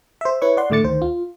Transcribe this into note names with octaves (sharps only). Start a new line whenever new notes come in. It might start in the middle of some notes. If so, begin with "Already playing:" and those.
C5 E5
E4 B4 C#5 C#6
D5 F#5 C6
A2 D3 A3 D6 A6 C#7
D2 D#3 C5
F4